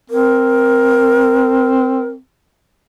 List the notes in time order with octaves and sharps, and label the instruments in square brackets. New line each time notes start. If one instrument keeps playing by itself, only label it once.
[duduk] C4 [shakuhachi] A#4